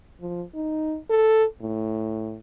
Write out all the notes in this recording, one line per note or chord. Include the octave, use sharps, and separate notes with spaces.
F3
D#4
A4
A2